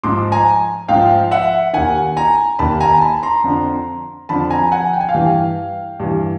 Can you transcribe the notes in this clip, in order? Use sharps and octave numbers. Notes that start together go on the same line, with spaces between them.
G#2 F3 C6 D6
G#5 A#5
G#2 F3 F5 G5
E5 F#5
D#2 D#3 F#5 G#5
G#5 A#5
D#2 D#3 A5 B5
G#5 A#5
A5 B5
A#5 C6
F2 D3 F3
F2 D3 F3 A5 B5
G#5 A#5
F#5 G#5
G5
G#5
F5 G5
G2 E3
G2 E3